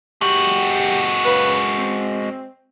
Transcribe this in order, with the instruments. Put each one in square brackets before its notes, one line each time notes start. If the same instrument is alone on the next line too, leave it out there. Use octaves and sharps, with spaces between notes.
[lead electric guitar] G#3 F#4 [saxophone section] G4
[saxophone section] C#3 B4
C4